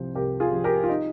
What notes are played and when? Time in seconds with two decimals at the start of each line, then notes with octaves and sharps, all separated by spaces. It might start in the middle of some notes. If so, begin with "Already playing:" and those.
Already playing: C2 C3 F3 C5
0.15 C2 G4 A#4
0.40 F4 G#4
0.53 C3 F3
0.64 G4 A#4
0.83 F4
0.89 D#4